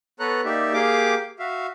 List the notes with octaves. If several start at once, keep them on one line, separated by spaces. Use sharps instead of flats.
B3 A4 B4 C#5 A#5 F#6
A#3 D#4 G4 D5 E5
A#3 G4 G#4 F5 G5 D6
F#4 E5 F5